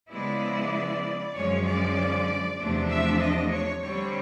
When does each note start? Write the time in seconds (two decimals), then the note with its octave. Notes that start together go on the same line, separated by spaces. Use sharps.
0.10 C#3 F3 G#3 B3 E4 D5
1.35 F#2 D3 F3 G#3 C#4 C#5
1.66 D5
2.59 E2 C3 F3 A3 D4
2.90 E5
3.21 D#5
3.52 C#5
3.83 D3 G3 C4 C#5